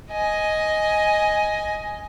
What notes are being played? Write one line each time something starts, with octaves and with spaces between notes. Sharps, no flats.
D#5 G#5